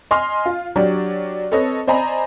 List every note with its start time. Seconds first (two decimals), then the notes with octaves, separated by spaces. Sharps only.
0.11 D#5 G#5 C6 F6
0.46 F4
0.76 F#3 D4 G4 D5
1.51 C4 A4 B4 C#5 D#5
1.88 C5 D5 D#5 G#5 A#5 B5